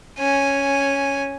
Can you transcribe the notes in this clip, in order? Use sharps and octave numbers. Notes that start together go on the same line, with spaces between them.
C#4 G#5